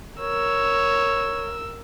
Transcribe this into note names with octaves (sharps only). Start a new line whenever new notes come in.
A#4 C#5 E6